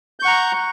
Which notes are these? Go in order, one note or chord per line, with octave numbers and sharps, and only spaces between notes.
F#5 A#5 C#6 G6